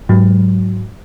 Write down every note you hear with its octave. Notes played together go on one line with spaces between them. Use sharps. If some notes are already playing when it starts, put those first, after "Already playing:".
G#2 F#3